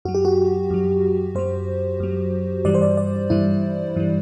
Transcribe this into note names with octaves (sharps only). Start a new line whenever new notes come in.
F#2 F#3 F#4
G4
F#4
F#2 F#3
F#2 F#3 C5
F#2 F#3
G2 E3 G3 D5
C5
D5
D5
G2 E3 G3 E4
G2 E3 G3